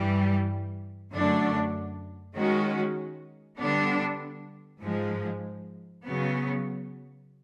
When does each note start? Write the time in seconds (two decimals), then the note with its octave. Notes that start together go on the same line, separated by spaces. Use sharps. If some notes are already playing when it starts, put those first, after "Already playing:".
Already playing: G2 E3 G3
1.12 F#2 D3 F#3 A3 D4
2.35 D#3 G#3 C#4 F#4
3.59 D3 G3 B3 D4
4.82 G#2 F3 G#3
6.05 C#3 F#3 B3